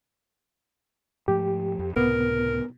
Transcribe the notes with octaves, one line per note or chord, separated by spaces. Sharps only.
G#2 F3 A3 G4
F2
C#2 A2 C3 B3 A#4